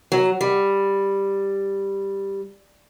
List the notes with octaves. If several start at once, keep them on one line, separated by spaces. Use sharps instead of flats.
F#3
G3